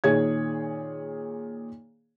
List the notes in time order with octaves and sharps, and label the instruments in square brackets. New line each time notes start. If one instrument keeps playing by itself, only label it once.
[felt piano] A#2 D#3 G#4 C#5 G#6